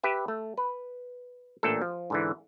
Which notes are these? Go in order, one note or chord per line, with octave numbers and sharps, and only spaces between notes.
G4 B4 E5
A3
B4
A1 A#2 A3 D4 A4
F3
G#2 D3 E3